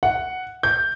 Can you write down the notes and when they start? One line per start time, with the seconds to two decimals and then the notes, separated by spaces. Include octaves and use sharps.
0.03 F#5
0.63 G6